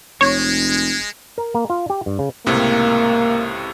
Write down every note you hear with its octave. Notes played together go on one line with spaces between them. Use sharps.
F1 G#3 C#5
A#4
A#3
F4
G4
G2
C#3
C#2 A2 C3 A#3